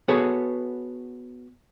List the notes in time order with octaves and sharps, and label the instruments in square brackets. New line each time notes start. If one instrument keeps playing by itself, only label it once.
[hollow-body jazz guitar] B3 F#4 G#4 A4 B4 C#5